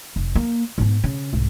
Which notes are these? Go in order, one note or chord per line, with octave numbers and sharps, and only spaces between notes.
F1
A#3
G#2 B3
C#3
C2 G#2